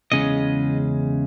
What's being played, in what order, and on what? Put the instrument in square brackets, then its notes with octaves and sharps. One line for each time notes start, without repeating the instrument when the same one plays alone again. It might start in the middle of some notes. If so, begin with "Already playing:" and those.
[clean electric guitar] E2 C#3 G#3 C#4 D#5